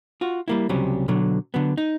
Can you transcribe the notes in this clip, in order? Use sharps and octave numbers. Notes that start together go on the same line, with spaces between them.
F4 F#4
G3 A#3 E4
C#2 C3 F#3 G3 C#4
B2 D3 F#3
D3 F#3 B3
D#4